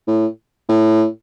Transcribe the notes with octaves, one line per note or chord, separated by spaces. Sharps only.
A2
A2